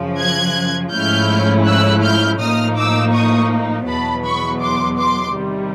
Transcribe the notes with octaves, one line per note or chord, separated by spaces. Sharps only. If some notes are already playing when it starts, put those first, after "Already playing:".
Already playing: F#2 C#3 F3
F#6 G#6
G#2 F3 A3 C#4 E4 F6 G6
E6 F#6
F6 G6
A2 F3 A#3 D#4 D#6 F6
D6 E6
C#6 D#6
E2 B2 F#3 B3 A5 B5
B5 C#6
C6 D6
C6 D6
C3 D#3 G3